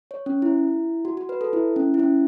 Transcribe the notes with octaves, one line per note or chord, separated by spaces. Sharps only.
C#5
C#4
E4
F#4
F#4
B4
A4
E4
C#4
E4
C#4